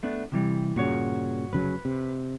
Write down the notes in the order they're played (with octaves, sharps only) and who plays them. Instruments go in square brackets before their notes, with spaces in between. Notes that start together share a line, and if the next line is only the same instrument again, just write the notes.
[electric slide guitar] A3 B3 D4
C3 E3 G3
[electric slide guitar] G2 F#4 C#5 [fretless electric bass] A#2 C#3
[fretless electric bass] F1 C#3 F#3 [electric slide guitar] B4
[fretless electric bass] C3